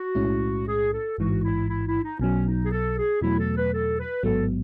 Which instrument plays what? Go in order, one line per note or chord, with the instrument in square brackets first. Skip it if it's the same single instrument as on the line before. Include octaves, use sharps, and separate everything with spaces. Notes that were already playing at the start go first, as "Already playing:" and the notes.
Already playing: [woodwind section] F#4
[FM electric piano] B1 A2 G#3 C#4 E4
[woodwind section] G#4
A4
[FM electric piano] A1 G#2 E3 [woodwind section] F#4
[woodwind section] E4
E4
E4
D#4
[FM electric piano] B1 B2 F#3 [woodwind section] C#4
[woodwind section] D#4
G#4
A4
G#4
[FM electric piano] E2 B2 F#3 A3 [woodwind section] E4
[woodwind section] A4
B4
A4
B4
[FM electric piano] A1 G#2 F#3 B3 [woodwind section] A4